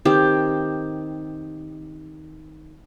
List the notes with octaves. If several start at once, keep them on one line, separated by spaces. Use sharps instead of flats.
D#3 C4 G4